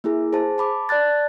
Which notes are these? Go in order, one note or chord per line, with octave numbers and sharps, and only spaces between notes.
A#3 E4 G#4
G#4 C5 A5
A5 B5 D6
D5 A5 F#6 A6